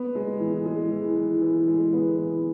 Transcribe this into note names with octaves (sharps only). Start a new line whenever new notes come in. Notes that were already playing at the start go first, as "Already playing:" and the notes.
Already playing: B3
G#3
E3
G#3
E3
E3
E3
G#3
B3
E3